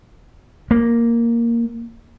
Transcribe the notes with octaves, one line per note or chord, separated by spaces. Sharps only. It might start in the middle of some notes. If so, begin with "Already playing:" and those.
A#3